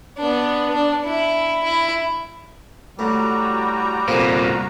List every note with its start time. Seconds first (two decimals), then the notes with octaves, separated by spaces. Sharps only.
0.18 B3 D4
0.74 D4
1.05 E4
1.64 E4
2.99 A2 G3 F#4 A#5
4.08 C2 F2 A#2 F3